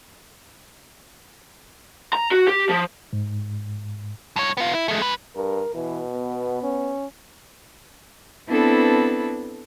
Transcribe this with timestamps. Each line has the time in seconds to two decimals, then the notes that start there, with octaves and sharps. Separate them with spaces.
2.13 A#5
2.31 F#4
2.48 G4
2.69 F3
3.13 G#2
4.36 G2 C#5
4.57 B3 F4
4.74 E4
4.88 G#3 A3
5.02 G#2 B4
5.36 G2 A#4
5.74 B2 E3
6.14 B3
6.63 C#4
8.47 B3 C4 D4 E4 A4 B4